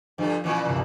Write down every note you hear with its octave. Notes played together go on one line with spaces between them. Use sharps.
G2 F3 A3
A#2 E3 C#4 F4
D2 G2 C3